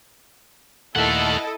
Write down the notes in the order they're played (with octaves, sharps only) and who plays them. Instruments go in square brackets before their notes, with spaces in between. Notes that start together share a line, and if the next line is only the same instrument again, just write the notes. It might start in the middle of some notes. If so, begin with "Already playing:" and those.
[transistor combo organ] D#2 A#2 A3 [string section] E4 A4 D#5 [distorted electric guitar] E5 F#5